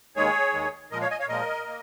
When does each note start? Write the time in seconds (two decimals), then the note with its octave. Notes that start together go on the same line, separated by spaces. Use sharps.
0.16 D#2 D#3 G#3 G#4 C#5
0.54 D#2 D#3 G#3
0.92 A#2 F3 G#3 A#4 D#5
1.01 C#5 F5
1.10 D#5 G#5
1.19 C#5 F5
1.28 A#2 F3 G#3 A#4 D#5
1.66 A#3